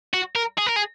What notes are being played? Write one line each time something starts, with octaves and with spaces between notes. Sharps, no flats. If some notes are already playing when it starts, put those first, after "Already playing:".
F#4
A#4
G#4
A#4
G#4